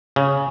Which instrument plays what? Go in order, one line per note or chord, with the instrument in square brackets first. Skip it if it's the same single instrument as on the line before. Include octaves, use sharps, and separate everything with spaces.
[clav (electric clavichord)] C#3